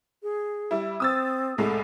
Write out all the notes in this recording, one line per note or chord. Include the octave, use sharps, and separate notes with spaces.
G#4
G3 E4
C4 D#6 E6 A6
C2 A2 G#3 A4